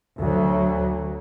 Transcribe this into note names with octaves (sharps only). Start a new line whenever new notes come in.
D2 F#3